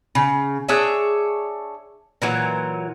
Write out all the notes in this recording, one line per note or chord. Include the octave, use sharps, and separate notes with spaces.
C#3
D4 G#4 C#5 E5
A#2 E3 F#3